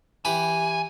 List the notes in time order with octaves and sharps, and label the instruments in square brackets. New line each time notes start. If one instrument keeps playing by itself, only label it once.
[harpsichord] E3 E4 G4 [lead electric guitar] G#5